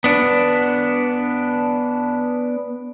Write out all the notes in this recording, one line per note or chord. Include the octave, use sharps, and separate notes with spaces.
B3 D4